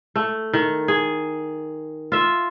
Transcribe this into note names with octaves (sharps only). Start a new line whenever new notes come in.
A3
D#3
G#4
F4 E5